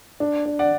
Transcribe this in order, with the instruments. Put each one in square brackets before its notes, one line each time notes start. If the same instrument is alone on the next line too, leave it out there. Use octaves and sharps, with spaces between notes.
[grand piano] D4
D4
[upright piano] D5 F#5